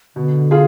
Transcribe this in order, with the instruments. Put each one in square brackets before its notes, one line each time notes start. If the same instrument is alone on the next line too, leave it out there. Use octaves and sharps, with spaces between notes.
[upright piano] B2 [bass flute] D3
[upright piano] F4 G#4